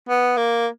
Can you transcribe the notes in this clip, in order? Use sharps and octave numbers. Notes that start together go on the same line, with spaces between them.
B3
A#3